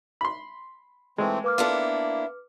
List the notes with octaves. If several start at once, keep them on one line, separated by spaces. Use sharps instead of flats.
B5 C6
E3 G#3 A3 C4
A#3 B4 D6 F6
B3 D4 E4 F4 A4